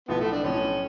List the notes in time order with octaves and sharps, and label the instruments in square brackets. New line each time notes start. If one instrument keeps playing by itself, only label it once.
[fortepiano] B1 A2 F3 [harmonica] B3
[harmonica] A3
D4
[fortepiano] B1 A2 F3 [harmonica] C#4